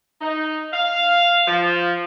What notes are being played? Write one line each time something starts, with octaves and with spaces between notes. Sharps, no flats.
D#4
F5
F3